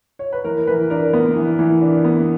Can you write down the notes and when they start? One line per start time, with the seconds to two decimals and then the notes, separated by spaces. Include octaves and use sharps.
0.19 C#5
0.33 B4
0.44 E3 A#4
0.67 E3 B4
0.90 D4 A#4
1.13 B3
1.36 E3
1.59 E3
1.81 D4
2.04 B3